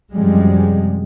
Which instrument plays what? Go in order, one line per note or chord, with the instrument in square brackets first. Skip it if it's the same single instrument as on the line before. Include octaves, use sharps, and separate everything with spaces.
[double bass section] F#2 C3 F3 G3 G#3